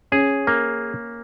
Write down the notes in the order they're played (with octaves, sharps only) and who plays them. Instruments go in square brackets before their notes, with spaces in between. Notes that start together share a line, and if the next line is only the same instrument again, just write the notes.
[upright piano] C#4 [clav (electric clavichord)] G#4
[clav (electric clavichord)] A#3